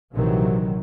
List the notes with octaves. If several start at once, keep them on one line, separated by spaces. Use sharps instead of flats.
A#1 C3 D#3 E3 F#3